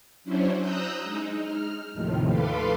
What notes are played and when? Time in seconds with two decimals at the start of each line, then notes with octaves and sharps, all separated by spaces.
0.24 F#3 C#4 D4 E4 C5
0.58 A#5 D#6 E6 F#6 G6
1.03 G#3 D#4
1.40 F6
1.94 D#2 A2 C3 D#3 F3
2.27 A4 B4 F5 B5 C6 D6